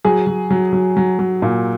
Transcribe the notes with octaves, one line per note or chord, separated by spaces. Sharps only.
F#3 G#4
F#3
F#3
F#3
F#3
F#3
A#2